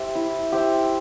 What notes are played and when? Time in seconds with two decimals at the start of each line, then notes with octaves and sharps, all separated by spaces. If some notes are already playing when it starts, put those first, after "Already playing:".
Already playing: G4 C5 E5
0.15 E4
0.52 G4 C5 E5